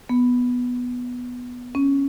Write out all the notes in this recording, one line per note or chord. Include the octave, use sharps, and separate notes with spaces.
B3
C#4